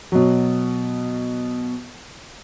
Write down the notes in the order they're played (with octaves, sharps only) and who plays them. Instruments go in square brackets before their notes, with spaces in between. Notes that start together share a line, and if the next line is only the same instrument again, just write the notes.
[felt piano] B2 F#3